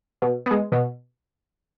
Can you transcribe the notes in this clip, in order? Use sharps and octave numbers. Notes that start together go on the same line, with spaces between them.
B2
G#3 B3
B2